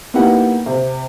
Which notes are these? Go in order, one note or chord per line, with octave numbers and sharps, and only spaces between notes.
A#3 B3 D#4 E4 G4 F#5
C3